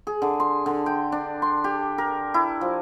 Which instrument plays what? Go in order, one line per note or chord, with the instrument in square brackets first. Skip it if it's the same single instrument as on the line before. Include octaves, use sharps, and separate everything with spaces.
[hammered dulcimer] G#4
D3
C6
D3
G5
D4
C6
G4
A#4
E4
F3